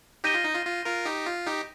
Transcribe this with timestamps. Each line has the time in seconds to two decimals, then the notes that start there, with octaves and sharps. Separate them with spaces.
0.24 D#4 G4 G6 A#6 D#7 G7
0.34 F4
0.44 D#4
0.55 F4
0.65 F4
0.85 F4 A#4
1.05 D#4 G4
1.26 F4
1.47 D#4 G4